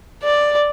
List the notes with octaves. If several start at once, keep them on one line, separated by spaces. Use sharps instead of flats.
D5